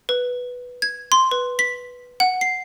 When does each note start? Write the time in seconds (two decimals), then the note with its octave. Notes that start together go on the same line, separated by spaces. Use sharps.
0.09 B4
0.82 G#6
1.12 C6
1.31 B4
1.59 B6
2.20 F#5
2.41 C7